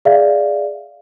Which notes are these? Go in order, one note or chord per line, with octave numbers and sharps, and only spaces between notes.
G#4 D5 E5 F5